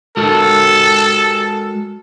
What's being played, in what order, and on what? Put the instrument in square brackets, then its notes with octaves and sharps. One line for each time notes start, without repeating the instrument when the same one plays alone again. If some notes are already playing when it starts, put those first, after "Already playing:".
[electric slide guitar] G#3 F#4 A#4 [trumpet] A4